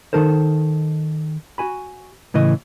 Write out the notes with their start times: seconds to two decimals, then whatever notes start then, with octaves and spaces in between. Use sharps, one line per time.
0.13 D#3 D#4 A4 A#4 C5
1.58 F#4 G#5 B5
2.34 A2 C#3 E3 D#5